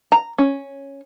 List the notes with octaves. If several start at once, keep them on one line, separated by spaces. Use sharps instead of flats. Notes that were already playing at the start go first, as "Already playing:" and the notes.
A#5
C#4